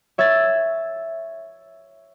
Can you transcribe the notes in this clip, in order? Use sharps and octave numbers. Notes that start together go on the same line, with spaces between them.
C#5 E5 F6 G#6 A6